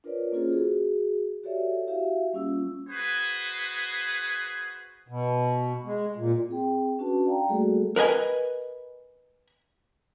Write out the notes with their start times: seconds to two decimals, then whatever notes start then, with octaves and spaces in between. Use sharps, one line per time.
0.04 D4 F4 A#4 B4 C#5 D5
0.32 A#3 C#4 F4 G#4 A4 C5
0.49 F#4 G#4
1.44 F#4 G4 A4 C#5 D5 E5
1.87 E4 F#4 G4 E5 F5
2.33 G3 A#3 C#4 F4 E6
2.88 F#4 G#4 B4 C5
5.08 B2
5.85 G#3
6.17 A#2
6.49 C4 G#4 G5
6.99 C#4 D4 F#4 B4 A5
7.26 D5 F5 G5 A#5
7.48 G3 A3 A#3 F#4 G#4 A4
7.96 A#4 B4 D#5 G#5